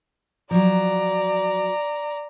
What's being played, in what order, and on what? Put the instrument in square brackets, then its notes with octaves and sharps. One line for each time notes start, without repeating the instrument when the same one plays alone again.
[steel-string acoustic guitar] F3 F#3 [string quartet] D5 A#5